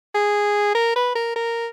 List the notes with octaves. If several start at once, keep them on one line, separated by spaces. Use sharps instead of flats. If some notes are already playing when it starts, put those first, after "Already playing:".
G#4
A#4
B4
A#4
A#4